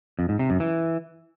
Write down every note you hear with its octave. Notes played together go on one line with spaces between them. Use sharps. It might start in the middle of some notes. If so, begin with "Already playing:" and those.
F2
G#2
C3
F#2
E3